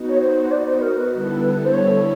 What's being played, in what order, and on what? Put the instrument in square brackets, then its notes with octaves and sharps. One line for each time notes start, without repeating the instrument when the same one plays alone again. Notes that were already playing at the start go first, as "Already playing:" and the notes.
Already playing: [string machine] B3 D#4 F#4
[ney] C#5
C5
D5
C5
A#4
B4
[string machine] D3 G3 B3 E4 A4
[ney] C5
C#5